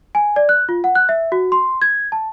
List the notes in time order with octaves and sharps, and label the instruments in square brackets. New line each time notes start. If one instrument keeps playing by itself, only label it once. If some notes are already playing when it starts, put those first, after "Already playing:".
[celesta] G#5
D5
F#6
F4
F#5
F#6
E5
F#4
C6
G#6
A5